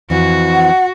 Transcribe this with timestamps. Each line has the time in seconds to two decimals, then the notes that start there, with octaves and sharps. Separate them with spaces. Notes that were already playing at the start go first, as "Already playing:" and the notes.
0.10 F2 E3 F#4
0.54 F#5